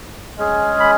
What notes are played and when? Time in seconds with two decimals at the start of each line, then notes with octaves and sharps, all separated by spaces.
0.38 G#3 C#4 G#4
0.80 B5